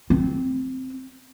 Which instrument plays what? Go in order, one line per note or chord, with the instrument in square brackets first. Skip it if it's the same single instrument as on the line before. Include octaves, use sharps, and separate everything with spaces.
[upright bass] C4